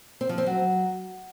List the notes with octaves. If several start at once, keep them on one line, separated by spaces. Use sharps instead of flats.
C4
F3
C4
F#3